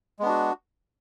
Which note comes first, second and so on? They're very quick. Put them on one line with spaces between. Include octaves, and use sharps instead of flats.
G#3 B3 D4 F#4